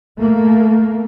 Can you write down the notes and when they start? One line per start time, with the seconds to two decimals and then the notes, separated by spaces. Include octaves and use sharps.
0.16 A3 A#3